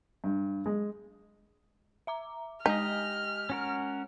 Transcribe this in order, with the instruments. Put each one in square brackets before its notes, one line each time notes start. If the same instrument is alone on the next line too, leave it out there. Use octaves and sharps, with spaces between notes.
[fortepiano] G2
G#3
[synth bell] E5 A#5 D6
[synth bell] G#3 G#5 [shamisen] D#4 [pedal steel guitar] G4 D#5 [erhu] F6
[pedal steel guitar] C#4 F#4 A#4